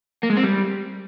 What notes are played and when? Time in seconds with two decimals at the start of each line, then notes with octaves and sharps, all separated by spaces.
0.23 A#3
0.30 G#3
0.37 C4
0.43 G3